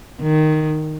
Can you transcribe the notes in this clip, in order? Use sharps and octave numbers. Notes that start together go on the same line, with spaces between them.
D#3